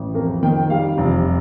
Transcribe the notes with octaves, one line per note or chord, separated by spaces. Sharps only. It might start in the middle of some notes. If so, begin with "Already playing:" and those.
Already playing: A1
F2 A#4
D#3 G5
G3 F5
F1